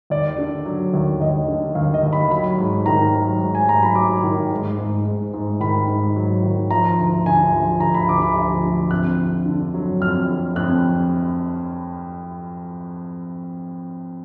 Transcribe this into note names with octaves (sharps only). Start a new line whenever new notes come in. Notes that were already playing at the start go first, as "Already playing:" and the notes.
D#2 D5
D3
F#3
D#2
D#2 D#5
D3
D#2 F5
D#5
D#2
B5
F#3 B5
G#2
D#3 A#5
F#3
G#2
G#5
F#3 A#5
B5
F#3 D6
D#3
G#2
G#2
G#2
G#2
D#3 B5
G#2
F#3
D#3
F3 A#5
D2
D2 G#5
F3
D2 A#5
B5
D2 D6
B5
F3
D3
F2 F#6
D3
D3
F#3
F2 F6
D3
F2 F#6